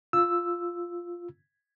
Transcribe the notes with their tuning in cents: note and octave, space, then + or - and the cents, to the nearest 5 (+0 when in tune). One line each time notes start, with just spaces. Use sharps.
F4 +0 E6 +0